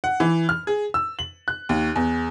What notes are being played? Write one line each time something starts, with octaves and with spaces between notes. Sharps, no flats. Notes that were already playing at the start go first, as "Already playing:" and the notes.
F#5
E3
F6
G#4
E6
F#7
F#6
D#2
E2